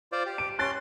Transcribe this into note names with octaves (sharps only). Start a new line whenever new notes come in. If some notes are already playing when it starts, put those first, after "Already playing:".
F4 C5 D5
G4
D7
C#4 C6 F#6 A6